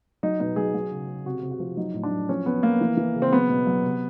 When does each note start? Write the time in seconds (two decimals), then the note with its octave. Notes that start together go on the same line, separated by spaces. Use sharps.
0.23 F#3 D#4
0.40 B2 D#4
0.56 F#3 G#4
0.74 F#3
0.91 C#3
1.08 C#3
1.25 C3 F#4
1.42 C3
1.51 F#4
1.60 F3
1.77 F#3 D#4
1.94 A2
2.03 D4
2.11 F#3
2.29 F3 C#4
2.46 F3 B3
2.63 F3 A#3
2.81 E3
2.97 E3
3.15 C#3
3.22 C4
3.32 F#3 B3
3.49 B2
3.67 F#3
3.83 C3